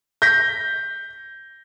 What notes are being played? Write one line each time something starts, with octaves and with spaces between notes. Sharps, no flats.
G6 A#6 B6